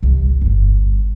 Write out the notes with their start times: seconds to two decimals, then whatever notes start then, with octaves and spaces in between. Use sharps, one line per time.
0.03 G1 C2
0.42 G1 G2